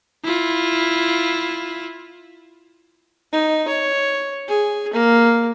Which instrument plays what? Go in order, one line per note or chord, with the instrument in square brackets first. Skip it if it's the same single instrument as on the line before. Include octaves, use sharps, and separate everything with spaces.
[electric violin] E4 F4
[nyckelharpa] D#4
C#5
G#4
A#3